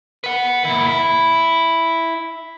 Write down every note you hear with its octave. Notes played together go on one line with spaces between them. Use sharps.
B4 F#5
A#2 E4
E4